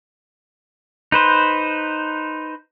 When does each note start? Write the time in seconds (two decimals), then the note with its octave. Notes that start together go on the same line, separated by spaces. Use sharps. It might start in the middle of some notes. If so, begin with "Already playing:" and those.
1.12 D#4 B4 C5